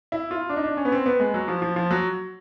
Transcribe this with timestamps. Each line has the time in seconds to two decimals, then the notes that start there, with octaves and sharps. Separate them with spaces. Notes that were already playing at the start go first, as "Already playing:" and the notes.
0.12 E4
0.31 F4
0.49 D4
0.56 D#4
0.63 D4
0.77 C#4
0.85 B3
0.92 C4
1.06 B3
1.20 G#3
1.34 F#3
1.48 F3
1.62 F3
1.76 F3
1.91 F#3